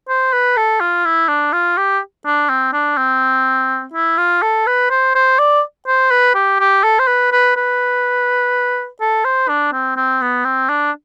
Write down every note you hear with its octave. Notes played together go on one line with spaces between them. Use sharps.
C5
B4
A4
F4
E4
D4
F4
G4
D4
C4
D4
C4
E4
F4
A4
B4
C5
C5
D5
C5
B4
G4
G4
A4
C5
B4
B4
B4
A4
C5
D4
C4
C4
B3
C4
D4